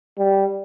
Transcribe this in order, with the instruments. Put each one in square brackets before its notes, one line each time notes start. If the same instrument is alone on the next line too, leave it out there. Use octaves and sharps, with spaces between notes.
[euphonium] G3